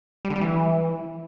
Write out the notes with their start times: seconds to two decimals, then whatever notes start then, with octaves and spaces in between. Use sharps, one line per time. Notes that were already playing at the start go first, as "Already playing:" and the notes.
0.25 G3
0.30 D3
0.36 G3
0.41 E3